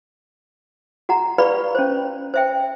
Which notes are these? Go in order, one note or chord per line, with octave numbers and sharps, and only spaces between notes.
F#4 F#5 A#5
G4 B4 D5 F5 B5 C#6
C#4 C5
C5 E5 G5